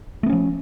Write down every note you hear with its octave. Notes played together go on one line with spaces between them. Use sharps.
F3 A3 B3 C#4